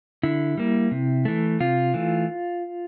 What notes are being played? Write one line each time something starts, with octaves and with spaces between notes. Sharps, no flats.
D3 E4
G3 A#3
C3
E3 A3
C3 F4
E3 A3